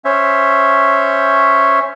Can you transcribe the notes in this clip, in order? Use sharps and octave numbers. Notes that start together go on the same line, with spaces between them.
C#4 C5 C#5 E5